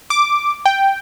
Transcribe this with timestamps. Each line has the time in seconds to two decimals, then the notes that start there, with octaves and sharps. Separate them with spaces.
0.10 D6
0.66 G5